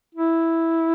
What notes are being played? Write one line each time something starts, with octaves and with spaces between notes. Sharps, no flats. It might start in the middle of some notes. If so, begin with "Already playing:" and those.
E4